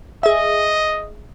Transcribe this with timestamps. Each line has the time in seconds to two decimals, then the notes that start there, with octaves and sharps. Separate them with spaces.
0.23 G#4 D#5 E5